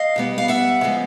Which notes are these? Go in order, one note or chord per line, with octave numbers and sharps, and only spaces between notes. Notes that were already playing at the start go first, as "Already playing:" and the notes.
Already playing: D#5 F5
B2 G3 B3
F5
E5 F#5
C#3 F3 G#3 B3